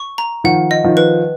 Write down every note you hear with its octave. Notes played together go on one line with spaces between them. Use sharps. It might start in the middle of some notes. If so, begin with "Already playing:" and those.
Already playing: C#6
A#5
D#3 F3 F#5
D#5
D#3 F3
B4